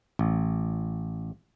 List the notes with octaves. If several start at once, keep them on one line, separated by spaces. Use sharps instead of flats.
A1